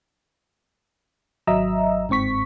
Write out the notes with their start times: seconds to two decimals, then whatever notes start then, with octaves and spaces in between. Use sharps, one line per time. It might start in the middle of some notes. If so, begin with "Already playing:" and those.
1.47 G#1 F#3 D#5 E5 A#5 E6
2.09 G1 G#2 C4 C#6 B6